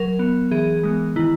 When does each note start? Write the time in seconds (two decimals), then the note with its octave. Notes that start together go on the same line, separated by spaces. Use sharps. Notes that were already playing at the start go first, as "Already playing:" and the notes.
Already playing: F#3 A#4
0.19 B3
0.51 E3 G#4
0.83 G#3 B3
1.16 D#3 E4